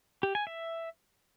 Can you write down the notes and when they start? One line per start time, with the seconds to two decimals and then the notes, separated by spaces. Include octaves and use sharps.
0.23 G4
0.35 G#5
0.47 E5